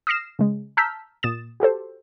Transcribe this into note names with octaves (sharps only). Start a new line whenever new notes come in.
D#6 F6 A#6 C7 E7
C#3 G#3
A5 A#5 E6 F6 G6 B6
A#2 D#6 A6 E7
F#4 G4 A4 C5